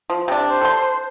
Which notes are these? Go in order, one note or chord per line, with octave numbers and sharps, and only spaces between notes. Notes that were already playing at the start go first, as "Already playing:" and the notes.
F3
C3 D4
C5
A4 C6